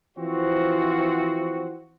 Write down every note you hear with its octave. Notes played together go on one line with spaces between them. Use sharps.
E3 F3 C4 F#4